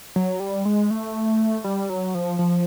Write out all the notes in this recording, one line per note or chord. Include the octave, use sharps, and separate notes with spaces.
F#3
G3
G#3
A3
G3
F#3
F3
F3